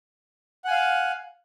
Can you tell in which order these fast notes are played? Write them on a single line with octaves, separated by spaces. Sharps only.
F#5 G#5 F5